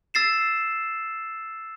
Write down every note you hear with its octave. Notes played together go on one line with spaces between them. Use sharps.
E6 A6 C7 E7